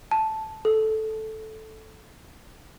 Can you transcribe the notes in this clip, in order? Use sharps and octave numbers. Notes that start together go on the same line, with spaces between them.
A5
A4